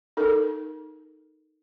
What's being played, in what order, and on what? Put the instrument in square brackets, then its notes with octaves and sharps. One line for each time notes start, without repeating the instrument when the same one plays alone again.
[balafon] D#4 A4 A#4